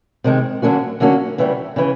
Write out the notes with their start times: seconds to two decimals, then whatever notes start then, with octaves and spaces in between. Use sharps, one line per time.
0.24 C3 D#3 G#3
0.62 D3 F#3 A#3 C#4 F#4
1.00 D3 F#3 A#3 C#4 F#4
1.38 C#3 E3 G3
1.76 C#3 E3